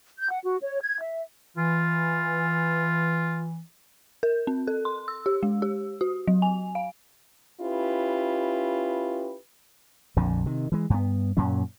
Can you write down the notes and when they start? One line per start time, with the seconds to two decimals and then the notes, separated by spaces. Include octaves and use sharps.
0.18 G6
0.31 F#5
0.44 F#4
0.61 C#5
0.81 G#6
1.02 E5
1.57 E3 F4
4.23 A#4
4.47 C4
4.67 A4
4.85 C6
5.08 E6
5.26 G4
5.43 G#3
5.62 G4
6.01 F#4
6.28 F#3
6.42 G#5
6.75 F5
7.61 C#4 E4 F4 G4 B4
10.17 A#1 F2 D3
10.46 C3 D#3
10.72 E3 G#3
10.90 G2 B3
11.37 F#2 A#2 F#3 C#4